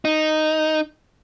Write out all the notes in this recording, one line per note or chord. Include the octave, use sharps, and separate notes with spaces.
D#4